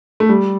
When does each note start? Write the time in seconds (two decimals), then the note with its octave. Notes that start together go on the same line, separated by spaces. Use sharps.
0.20 A3
0.29 G3